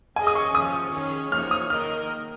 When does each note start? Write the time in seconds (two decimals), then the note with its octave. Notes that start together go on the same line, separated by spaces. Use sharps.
0.16 C#4 G#4 D#5 G#5
0.27 D#6
0.35 C#6
0.54 F3 C#4 F4 D#6
0.93 D#3 C#4 G#4 C#5
1.31 F3 A#3 D#4 C#5 F6
1.51 D#6
1.70 D#3 A#3 D#4 A#4 D#5 F6